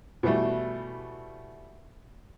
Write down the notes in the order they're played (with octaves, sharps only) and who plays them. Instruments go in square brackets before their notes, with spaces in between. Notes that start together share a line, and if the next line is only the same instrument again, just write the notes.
[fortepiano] B2 E3 G3 A3